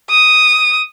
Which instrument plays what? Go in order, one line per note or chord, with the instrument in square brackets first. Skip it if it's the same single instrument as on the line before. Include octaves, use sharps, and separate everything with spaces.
[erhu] D#6